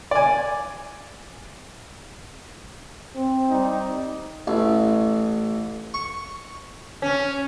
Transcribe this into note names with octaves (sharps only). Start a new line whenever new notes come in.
D5 G#5
C4
G3 D#4
A1
C#6
C#4